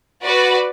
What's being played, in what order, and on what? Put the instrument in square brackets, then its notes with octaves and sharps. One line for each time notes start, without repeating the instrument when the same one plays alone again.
[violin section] F#4 B4 D5